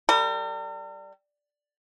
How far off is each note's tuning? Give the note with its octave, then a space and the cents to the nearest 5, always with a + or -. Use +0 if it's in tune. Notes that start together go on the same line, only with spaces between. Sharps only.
G3 +0 A#4 -45